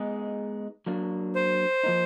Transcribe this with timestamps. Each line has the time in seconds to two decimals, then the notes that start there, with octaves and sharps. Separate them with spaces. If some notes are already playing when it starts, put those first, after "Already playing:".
Already playing: G#3 B3 D#4 G#4
0.86 F#3 A#3 D4
1.35 C5
1.83 F3 A#3 D#4